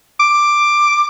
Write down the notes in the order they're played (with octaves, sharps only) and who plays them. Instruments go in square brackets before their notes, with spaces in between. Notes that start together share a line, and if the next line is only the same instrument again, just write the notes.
[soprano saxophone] D6